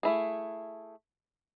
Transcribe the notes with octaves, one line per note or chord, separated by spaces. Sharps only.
A3 E4 G#4